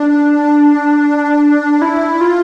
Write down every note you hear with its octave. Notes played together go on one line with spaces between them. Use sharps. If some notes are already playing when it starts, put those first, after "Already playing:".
Already playing: D4
E4
F4